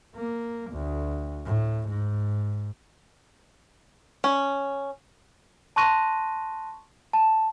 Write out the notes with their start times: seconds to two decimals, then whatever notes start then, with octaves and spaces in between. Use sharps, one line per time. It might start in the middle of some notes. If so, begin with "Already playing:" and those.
0.16 A#3
0.71 D2
1.46 A2
1.89 G#2
4.24 C#4
5.76 A5 C6 C#6 F#6 A#6 D#7
7.13 A5